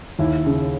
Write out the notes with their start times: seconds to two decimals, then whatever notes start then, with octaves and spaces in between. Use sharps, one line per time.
0.19 D#2 E4
0.46 C#3